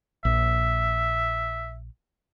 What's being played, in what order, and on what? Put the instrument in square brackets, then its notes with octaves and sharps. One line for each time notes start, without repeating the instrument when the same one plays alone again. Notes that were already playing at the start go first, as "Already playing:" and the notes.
[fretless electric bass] A#1 [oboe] E5